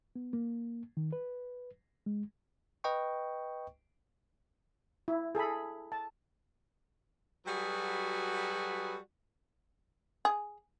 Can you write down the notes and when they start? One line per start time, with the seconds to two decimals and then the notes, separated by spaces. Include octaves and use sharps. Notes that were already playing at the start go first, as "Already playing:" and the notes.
0.16 B3
0.33 A#3
0.97 D#3
1.13 B4
2.06 G#3
2.84 B4 D#5 G5 C#6
5.08 E4
5.35 G#4 A4 G#5 B5
5.92 A5
7.46 F#3 G3 F#4 G#4 A4 B4
10.25 G#4